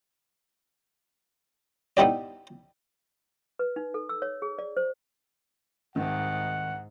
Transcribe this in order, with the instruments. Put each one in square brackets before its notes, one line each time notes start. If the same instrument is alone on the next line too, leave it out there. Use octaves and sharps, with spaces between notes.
[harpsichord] B3 D#4 E4 G4 D5
[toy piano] B4
D#4
A4
E6
C#5
G#4
D5
C5
[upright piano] C2 D#3 [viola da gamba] G#2 [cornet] F#5